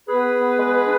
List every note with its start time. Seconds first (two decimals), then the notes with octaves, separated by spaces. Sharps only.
0.08 B3 G#4 B4
0.33 B3
0.58 G#3
0.82 D4